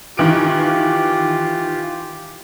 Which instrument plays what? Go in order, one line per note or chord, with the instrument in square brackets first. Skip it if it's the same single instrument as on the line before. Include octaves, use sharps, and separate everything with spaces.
[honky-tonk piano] D#3 E3 D7 [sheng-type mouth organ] F4 G4